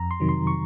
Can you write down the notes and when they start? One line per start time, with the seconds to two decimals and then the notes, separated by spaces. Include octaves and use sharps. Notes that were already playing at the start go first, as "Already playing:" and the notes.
Already playing: F2 A#5
0.11 C6
0.20 C3 D#3 F#3
0.29 C6
0.47 C#6